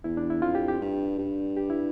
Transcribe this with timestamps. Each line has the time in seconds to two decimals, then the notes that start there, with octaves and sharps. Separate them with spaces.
0.04 E2 E4
0.17 D4
0.30 E4
0.42 F2 F4
0.55 G4
0.68 G4
0.81 G2
1.18 G2
1.57 G4
1.70 E4